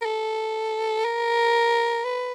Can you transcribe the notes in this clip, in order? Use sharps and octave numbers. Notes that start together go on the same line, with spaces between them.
A#4
A4
A#4
B4